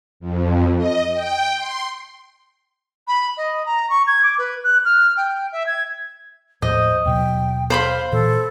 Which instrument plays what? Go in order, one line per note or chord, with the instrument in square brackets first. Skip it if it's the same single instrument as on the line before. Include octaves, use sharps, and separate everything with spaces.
[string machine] F2
D#5
G5
C6
[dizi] B5
D#5
A#5
C#6
G#6
D6
B4
F#6
F6
G5
E5
G#6
[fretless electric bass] D#2 A2 F3 [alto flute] C5 [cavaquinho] D#5
[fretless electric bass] D#2 B2 F#3 [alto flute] G5
[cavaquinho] C5 B5 C6 [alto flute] F5
[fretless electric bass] A#2 E3 [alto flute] A4